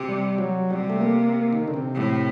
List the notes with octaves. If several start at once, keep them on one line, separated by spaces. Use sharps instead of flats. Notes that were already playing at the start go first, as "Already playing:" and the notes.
Already playing: C3
G3
F#3
C3 G3
A3
A#3
A#3
D#3
D3
C3
A2